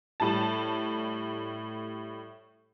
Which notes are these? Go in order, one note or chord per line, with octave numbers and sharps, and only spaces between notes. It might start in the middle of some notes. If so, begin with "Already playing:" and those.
A2 G3 A5